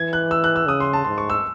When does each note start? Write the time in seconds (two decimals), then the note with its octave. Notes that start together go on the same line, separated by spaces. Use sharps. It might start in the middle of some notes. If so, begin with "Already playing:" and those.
Already playing: E3 G#6
0.13 F#6
0.31 E6
0.44 F#6
0.56 E6
0.67 C#3 D#6
0.80 C6
0.93 A5
1.05 G#2 C6
1.18 C#6
1.30 E6